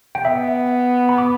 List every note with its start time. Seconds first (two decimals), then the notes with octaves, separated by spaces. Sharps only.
0.15 G5
0.25 B3 E5
1.09 B5
1.18 D6